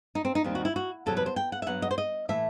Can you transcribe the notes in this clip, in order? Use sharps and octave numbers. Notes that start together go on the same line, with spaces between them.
D#4
C4
D#4
D#2 D#3 G3 C4
F#4
E4
F#4
E2 C3 F#3 A4
B4
C5
G5
F#5
E5
G2 F#3 B3 F#5
D#5
C5
D#5
A2 E3 A3 E5